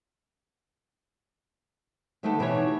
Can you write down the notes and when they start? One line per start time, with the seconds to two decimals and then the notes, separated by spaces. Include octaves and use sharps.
2.23 D3 D#3 A3 B3 G4 A4
2.39 B2 E3 D#4 G4 C#5